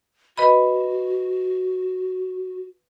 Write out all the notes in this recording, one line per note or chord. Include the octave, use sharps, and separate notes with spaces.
F#4 B4 D#5 B5